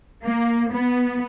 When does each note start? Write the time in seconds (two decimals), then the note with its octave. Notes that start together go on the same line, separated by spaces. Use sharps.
0.24 A#3
0.72 B3